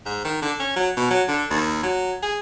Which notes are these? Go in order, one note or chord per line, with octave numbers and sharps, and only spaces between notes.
G#2
D#3
D3
C#4
F#3
B2
F#3
D3
D#2
F#3
G#4